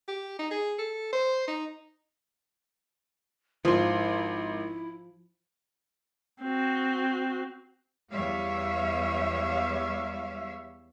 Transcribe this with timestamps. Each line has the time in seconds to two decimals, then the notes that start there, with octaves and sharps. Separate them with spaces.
0.08 G4
0.39 D#4
0.51 G#4
0.78 A4
1.13 C5
1.48 D#4
3.65 G#1 F3 E4 C6
6.42 C4 F#4
8.11 E2 G3 C#5 E5 F5